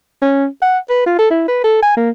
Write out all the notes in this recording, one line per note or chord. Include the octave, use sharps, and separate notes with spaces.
C#4
F#5
B4
F4
A4
E4
B4
A4
G#5
A#3